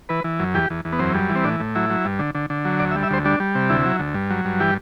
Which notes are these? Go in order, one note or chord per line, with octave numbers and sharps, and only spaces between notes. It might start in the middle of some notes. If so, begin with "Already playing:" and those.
E3 B4
E3
F#2
E2 G4
E2
E2
B3
F#2 C4
G3
E3
C4
A2 D4
A2
F#3 E4
F#3
G2
D3
D3
D3
F#3
D2 D5
E5
G3
E5
D2 C5
G3 D4
G3
C3
D2 E4
F#3
D2
G2
F#3
G2
E3 G4